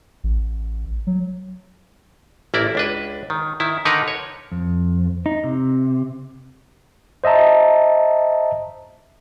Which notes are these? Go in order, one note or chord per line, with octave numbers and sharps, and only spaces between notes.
A1
F#3
A1 A#3 E4 D5
C#2 D4 B4
D#3
D#3 E4
D3 D#3 D#4 A#4 B4
C#5
F2
D#4
C3
C5 D#5 E5 A5 A#5